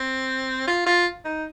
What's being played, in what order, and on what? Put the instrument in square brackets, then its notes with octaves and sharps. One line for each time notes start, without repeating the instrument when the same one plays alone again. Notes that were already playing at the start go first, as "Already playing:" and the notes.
Already playing: [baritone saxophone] C4
F4
F4
D#4